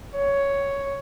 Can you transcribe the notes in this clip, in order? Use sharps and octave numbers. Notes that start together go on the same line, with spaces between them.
C#5